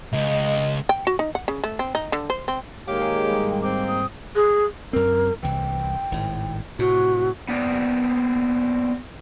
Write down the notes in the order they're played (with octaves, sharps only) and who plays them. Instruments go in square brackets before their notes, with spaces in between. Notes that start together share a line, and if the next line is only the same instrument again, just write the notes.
[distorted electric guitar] C#2 [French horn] D#5
[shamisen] G5
F#4
D#4
F#5
C#3
A3
C4
D#4
D3
C5
C4
[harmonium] D#3 G#3 A#3 [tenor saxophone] G4 [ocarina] C#5 [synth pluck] F5
[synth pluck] G#4 [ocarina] C#5
[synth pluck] G#2 G3
[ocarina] G5
[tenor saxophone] C4 [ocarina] D6
[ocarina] D#6
[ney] G#4
[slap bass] F#2 C4 [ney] A#4
[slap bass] C2 E3 [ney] G5
[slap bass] G#1 A2
[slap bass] A2 C3 [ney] F#4
[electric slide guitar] B3 C4 D5